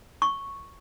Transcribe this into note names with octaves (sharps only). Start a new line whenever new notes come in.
C#6